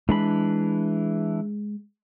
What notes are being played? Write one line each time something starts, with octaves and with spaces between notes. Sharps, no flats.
E3 G#3 D4 B5